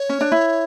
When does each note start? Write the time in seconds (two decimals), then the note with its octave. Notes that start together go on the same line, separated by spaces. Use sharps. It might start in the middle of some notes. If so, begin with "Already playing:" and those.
Already playing: C#5
0.09 C#4
0.21 D4
0.32 E4